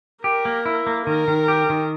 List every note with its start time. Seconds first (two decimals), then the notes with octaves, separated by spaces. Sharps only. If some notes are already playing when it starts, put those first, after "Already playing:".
0.24 G4 A#4
0.45 A#3
0.66 E4
0.87 A#3
1.06 D#3 A#4
1.28 D#3
1.48 G4
1.70 D#3